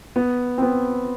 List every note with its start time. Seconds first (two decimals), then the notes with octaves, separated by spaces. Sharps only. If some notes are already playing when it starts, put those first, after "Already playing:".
0.16 B3
0.58 C4
0.62 B3